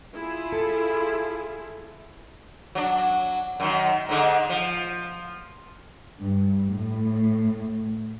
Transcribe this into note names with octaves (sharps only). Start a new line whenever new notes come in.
E4 F4 G#4
A4
F#3 D4
F#2 D#3
G#2 D3 D#4
F3
G2
A2